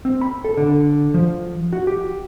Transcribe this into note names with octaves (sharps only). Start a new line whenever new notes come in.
C4
B5
A4
D3
F3
F#4
G4